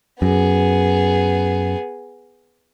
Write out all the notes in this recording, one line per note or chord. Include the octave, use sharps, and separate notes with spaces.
F#2 B3 G#4